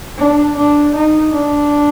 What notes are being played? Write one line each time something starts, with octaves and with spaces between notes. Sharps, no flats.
D4
D4
D#4
D4